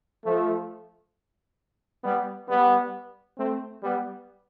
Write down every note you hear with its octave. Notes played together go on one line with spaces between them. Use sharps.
F3 A3
G3 B3
G3 B3
A3 C4
G3 B3